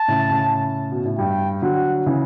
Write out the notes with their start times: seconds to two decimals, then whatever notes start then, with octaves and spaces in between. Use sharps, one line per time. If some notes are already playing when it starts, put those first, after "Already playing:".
Already playing: A5
0.08 A2 C#3
0.30 A2 C#3
0.91 B2
1.05 A2
1.18 G2 G5
1.62 D3 F#3 F#5
2.06 C#3 E3